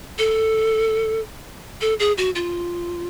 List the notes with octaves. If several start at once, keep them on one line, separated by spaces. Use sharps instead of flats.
A4
A4
G#4
F#4
F4